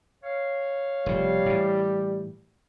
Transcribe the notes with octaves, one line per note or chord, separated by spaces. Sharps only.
C#5 F5
F1 B2 G3
A2 E3